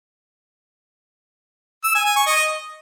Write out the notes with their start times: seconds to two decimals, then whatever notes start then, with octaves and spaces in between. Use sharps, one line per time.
1.84 E6
1.95 G#5
2.05 G#5
2.16 C#6
2.26 D#5